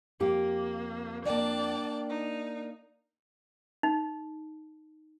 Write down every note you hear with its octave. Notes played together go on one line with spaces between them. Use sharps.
F2 A#3 G4
A#3 D4 D5 G5 A5
D#4
D#4